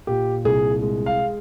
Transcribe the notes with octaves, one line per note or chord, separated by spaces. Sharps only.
A#2 G4
C2 G#4
G#3
F5